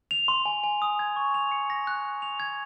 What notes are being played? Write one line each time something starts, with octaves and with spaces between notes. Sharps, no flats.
F7
C6
G#5
G#5
D#6
G#6
C#6
F7
C#7
A#6
F#6
F#6
F7
G#6